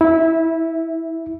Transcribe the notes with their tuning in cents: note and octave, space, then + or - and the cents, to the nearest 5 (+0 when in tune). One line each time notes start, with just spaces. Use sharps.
E4 -20 E5 +0